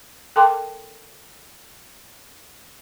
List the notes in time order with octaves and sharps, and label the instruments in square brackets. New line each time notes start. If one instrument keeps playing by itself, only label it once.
[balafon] A4 A#4 G5 A5 C6 D6